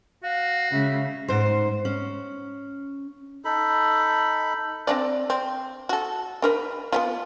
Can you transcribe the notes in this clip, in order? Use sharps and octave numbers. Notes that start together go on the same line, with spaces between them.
F#4 F5
C#3 G#3 E5
G#2 C5
C#4
D#4 A4 B5
C4 D4 D5
C4
F#4 A4
D4 A#4 B4
B3 C#4 F4